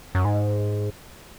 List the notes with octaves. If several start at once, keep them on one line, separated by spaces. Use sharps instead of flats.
F#2
G#2